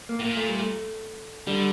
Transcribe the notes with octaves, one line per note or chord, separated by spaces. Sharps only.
A#3
A2
A#2 A#3
A3
G3
A3
D3 G3